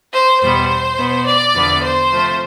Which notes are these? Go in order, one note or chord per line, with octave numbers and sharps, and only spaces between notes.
C5
E2 B2 G3 B3 C5
B2 B3
D5
E2 D3 F3 B3
C5
C3 F3 A3